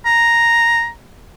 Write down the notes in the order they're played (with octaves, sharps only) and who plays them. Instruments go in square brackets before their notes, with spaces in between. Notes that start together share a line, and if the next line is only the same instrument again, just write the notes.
[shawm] A#5